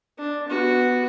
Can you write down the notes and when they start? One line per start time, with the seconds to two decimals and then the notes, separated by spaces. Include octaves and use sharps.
0.18 D4
0.48 B3 F#4